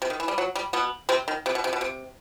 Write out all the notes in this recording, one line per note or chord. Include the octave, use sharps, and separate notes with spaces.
C3
D#3
E3
G3
F#3
G3
B2 B3
C3 C4
D#3
C3
B2
C3
B2
C3